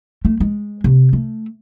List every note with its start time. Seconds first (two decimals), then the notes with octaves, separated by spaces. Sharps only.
0.25 A3
0.40 G#3
0.84 C3
1.13 A3